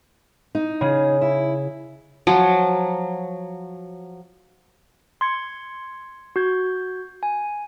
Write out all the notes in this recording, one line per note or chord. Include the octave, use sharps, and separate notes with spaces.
D#4
C#3 G#4
E4
F3 F#3
C6 G#6 C#7
F#4 G6 G#6
G#5